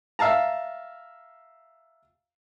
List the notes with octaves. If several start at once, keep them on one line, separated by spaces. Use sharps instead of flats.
E5 F5 A5 A#5